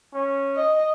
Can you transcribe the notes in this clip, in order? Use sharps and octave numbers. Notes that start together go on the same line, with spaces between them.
C#4
D#5